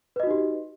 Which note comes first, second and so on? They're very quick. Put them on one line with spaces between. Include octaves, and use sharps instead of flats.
B4 D#5 F#4 D#4 G4